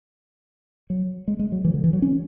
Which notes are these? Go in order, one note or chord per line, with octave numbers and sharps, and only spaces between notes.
F#3
G#3
G#3
F#3
E3
D3
E3
F#3
C#4